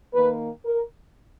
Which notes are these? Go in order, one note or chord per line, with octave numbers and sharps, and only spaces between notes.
D#3 A#3 B4
A#4